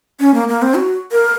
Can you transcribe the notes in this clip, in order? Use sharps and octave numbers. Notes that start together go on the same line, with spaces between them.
C#4
A#3
A#3
C4
F#4
A#4